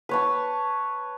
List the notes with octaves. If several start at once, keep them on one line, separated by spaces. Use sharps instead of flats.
B4 C#5 A5